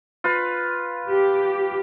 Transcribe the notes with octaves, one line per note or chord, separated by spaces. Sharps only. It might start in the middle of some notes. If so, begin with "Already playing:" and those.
F4 B4
G4